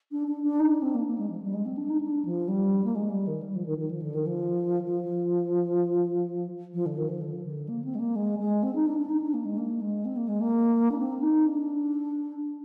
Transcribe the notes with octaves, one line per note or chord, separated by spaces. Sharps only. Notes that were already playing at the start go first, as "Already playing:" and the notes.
D4
D4
D4
D#4
D4
C4
A#3
A#3
G#3
F3
G3
G#3
C4
D4
D#4
D4
F3
G3
A#3
G#3
G3
D#3
G3
F3
D#3
D#3
F3
D3
D#3
F3
F3
F3
D3
D#3
F3
D3
D3
A#3
C4
G#3
A#3
G#3
G#3
C4
D#4
D4
D4
D#4
D4
A#3
G#3
A#3
G#3
C4
A#3
G#3
A#3
D4
C4
D#4
D4